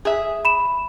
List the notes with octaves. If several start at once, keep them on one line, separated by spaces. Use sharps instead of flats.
G#4 E5
B5 E7